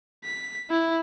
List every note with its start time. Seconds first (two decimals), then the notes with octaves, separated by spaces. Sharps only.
0.24 B6
0.70 E4